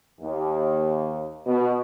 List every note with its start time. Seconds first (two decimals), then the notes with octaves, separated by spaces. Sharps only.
0.21 D#2
1.46 B2